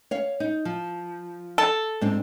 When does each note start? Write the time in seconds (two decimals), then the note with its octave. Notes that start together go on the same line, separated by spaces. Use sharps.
0.11 C#5 F5
0.40 D#4
0.65 F3
1.58 A4
2.01 G#2 C4 D4